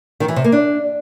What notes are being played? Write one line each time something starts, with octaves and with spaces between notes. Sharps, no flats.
D#3
E3
C3
A#3
D4